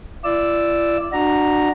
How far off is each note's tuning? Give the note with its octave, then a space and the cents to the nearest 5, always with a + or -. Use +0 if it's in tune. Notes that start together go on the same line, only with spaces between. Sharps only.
E4 +45 D5 +0 E6 +0
D4 +25 F#4 +0 A#5 +0